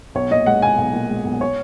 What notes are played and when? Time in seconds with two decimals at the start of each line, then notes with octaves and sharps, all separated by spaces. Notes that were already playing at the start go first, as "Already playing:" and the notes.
0.15 B1 C#5
0.31 A#2 D#5
0.46 G#3 F#5
0.62 B1 G#5
0.78 B1
0.94 A#2
1.10 G#3
1.25 B1
1.41 C#5